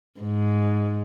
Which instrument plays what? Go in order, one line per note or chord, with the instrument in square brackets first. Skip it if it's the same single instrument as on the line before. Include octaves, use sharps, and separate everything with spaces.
[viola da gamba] G#2